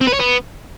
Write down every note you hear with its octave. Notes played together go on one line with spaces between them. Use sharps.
C4
B4
C#5
B3